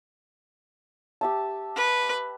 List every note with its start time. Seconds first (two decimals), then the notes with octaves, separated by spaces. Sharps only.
1.21 G4 E5 A5
1.76 B4